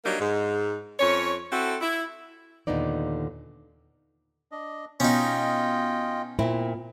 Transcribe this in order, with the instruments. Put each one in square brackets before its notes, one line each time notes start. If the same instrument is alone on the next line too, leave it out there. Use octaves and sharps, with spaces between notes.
[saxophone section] F#3 G3 A#3 D4 D#4
G#2
F2 C#4 C#5
C4 E4 F#4 A4
E4
[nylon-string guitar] D#2 A#2 D3 B3 D#4 D5
[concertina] D4 D#5
[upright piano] B2 [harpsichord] C#4 D#4 [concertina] F4 D#5 G5
[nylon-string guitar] A#2 C4 E4